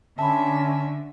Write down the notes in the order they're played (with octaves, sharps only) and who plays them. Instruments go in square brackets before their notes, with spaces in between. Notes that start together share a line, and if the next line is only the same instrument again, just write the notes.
[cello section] D3 [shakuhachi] C#4 [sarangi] E5 [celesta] A5 B5